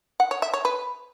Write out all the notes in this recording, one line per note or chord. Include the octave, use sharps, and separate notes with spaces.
F#5
C#5
E5
C#5
B4